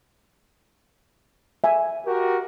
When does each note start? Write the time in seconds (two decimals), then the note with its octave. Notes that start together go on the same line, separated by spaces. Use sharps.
1.64 E5 G#5
2.05 F#4 G4 A#4